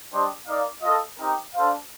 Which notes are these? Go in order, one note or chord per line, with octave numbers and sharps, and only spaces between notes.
G3 D4 G4 C5 D#5
D#4 A#4 D5 F5
F4 A4 D#5
C4 D#4 G4 A#4
D4 A4 C5 F5